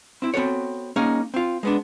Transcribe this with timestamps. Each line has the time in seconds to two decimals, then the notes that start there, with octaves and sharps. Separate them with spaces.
0.22 C4 E4
0.34 B3 C4 F#4 A4 C#5
0.96 A#3 C#4 D#4 G#4
1.34 C4 F4
1.63 G#3 B3 D4